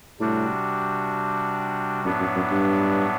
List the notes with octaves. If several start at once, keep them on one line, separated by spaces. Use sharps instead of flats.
A2 C3 G3 D4 F#4
F#2 A2 F#3 B3 D4
F#2
F#2
G2